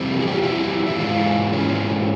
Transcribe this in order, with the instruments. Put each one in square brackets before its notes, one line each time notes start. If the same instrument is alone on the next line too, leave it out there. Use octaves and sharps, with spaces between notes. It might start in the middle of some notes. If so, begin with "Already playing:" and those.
Already playing: [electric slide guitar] F2 E3 G3 C4
G#4
G4
F4
E4
E4
G#2 E3 G#3 F4
C#4